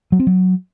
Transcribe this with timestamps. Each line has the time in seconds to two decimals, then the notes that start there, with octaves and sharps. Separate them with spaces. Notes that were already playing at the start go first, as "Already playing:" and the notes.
0.12 F#3
0.19 C4
0.27 F#3